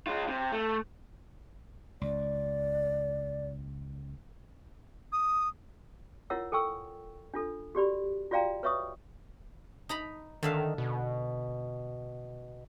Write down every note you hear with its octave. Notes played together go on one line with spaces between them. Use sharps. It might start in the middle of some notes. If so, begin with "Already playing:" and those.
G#3 F4
C3
A3
C#2 D5
D#6
E4 F4 A#4 C#5 F#5 E6
A4 G5 G#5 C#6 E6
D4 F4 A4
F#4 G4 D5 B5
F4 F#4 D5 F5 G5 A#5
B4 C#5 E5 C#6 D#6
D#4 A#5 B5
D3 D#3 E5 F5
B2